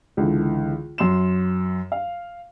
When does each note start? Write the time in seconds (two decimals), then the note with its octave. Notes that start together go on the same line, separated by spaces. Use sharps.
0.17 C#2 D3 E3
0.98 F#2 C6 E7
1.92 F5